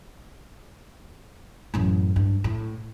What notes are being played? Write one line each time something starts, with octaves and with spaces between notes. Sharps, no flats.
A1 F#2
G2
A2